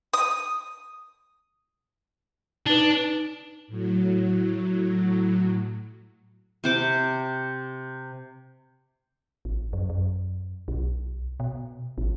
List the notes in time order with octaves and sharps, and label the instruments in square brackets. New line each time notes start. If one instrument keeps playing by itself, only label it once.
[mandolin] D#6
[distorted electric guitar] D4 [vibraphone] D#4 B4
[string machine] A2 F#3
[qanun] C3 C5 D6
[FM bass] A1
F#2
F#2
B1
B2
A1